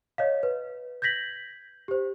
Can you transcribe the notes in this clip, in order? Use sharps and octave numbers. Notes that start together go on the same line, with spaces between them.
C#5 D#5 F5
B4
G6 G#6 A#6 B6 F#7
G4 C5